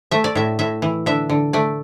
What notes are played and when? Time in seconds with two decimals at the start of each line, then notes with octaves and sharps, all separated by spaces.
0.11 A3 E5
0.24 D5
0.35 A2 E5
0.59 A2 E5
0.82 E3
1.06 D3 E5
1.29 D3
1.53 A3 D5